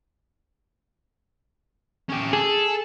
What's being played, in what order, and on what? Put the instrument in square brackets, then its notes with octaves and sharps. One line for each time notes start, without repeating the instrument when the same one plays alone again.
[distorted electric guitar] C#4 G4
[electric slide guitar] G#4 [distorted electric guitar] A4